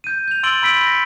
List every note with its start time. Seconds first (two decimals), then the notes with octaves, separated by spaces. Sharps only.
0.04 G6 D#7
0.28 G6 F7
0.43 C6 E6 A6 D7 F#7 G7
0.63 B5 E6 B6 D7 F#7
0.87 A#6 C#7